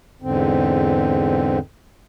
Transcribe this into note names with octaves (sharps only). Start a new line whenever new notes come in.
E2 G#2 D3 C4